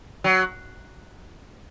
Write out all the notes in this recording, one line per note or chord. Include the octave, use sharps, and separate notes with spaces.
F#3